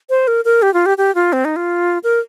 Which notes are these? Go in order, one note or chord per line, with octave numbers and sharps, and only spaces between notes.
C5
A#4
A#4
G4
F4
G4
G4
F4
C4
D#4
F4
A#4